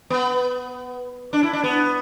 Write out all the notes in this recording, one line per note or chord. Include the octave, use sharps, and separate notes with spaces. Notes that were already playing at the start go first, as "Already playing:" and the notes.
B3
D4
E4
D4
B3